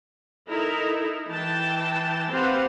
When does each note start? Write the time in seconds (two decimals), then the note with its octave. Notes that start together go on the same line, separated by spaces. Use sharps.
0.48 D#4 E4 A4 A#4
1.30 E3 G5 A5
2.31 C4 G4 B4 C5 F5 F#5